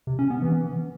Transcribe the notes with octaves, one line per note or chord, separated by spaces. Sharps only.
C3
C#4
B3
E3